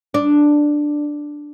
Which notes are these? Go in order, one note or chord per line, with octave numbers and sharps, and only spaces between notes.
D4